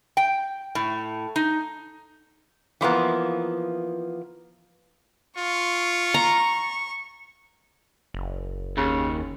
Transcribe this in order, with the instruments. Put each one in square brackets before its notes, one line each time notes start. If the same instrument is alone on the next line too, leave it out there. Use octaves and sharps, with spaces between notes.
[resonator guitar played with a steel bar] G5
A2
D#4
E3 F3 A#3 B3
[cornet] F4 [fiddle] C#6
[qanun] A#5
[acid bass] F#1
[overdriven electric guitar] D#2 [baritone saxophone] C#3